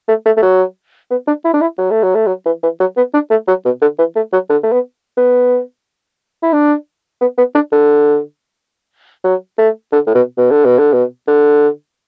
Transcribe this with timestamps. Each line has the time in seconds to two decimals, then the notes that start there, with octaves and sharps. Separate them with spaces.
0.08 A3
0.26 A3
0.37 A3
0.42 F#3
1.11 B3
1.27 D4
1.45 E4
1.54 D4
1.61 E4
1.78 F#3
1.90 A3
2.03 F#3
2.15 A3
2.27 F#3
2.46 E3
2.63 E3
2.80 F#3
2.97 B3
3.14 D4
3.31 A3
3.48 F#3
3.65 B2
3.82 D3
3.98 E3
4.16 A3
4.33 F#3
4.50 D3
4.63 A3
4.72 B3
5.17 B3
6.43 E4
6.53 D4
7.21 B3
7.38 B3
7.55 D4
7.72 D3
9.24 F#3
9.58 A3
9.92 D3
10.07 A2
10.15 B2
10.38 B2
10.51 D3
10.65 B2
10.79 D3
10.93 B2
11.28 D3